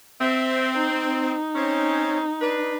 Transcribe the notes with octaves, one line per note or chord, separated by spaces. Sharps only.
C4 E5
D#4
C4 C#4
D4 B4